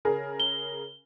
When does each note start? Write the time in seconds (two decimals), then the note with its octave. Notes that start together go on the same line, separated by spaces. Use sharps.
0.05 C#3 G#4 A#4
0.40 G7